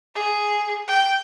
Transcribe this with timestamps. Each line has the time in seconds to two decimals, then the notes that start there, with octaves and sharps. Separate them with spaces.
0.15 G#4
0.88 G5